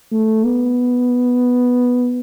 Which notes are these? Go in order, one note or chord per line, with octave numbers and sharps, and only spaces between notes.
A3
B3